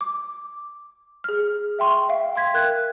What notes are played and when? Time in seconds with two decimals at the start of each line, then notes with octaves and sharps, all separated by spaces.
0.01 D6
1.24 G#4 F6
1.79 E5 G5 C6 C#6
2.09 E5 F5 G5
2.36 G5 C6 G#6 B6
2.54 A#4 F#6 G#6